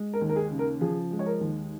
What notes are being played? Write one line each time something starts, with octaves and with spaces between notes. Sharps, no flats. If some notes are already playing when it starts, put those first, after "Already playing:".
Already playing: G#3
A#4
D#2
A#4
G#4
C#3
A#4
F3 G#4
G#3
C#5
A#4
D#2